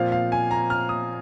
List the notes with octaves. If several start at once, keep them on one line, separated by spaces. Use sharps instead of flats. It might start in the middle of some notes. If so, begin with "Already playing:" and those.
Already playing: A#2 F3 C4 F4 F5
F5
G#5
A#5
F6
D#6